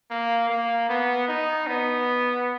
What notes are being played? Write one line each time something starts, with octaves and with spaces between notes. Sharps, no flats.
A#3
A#3
B3
D#4
B3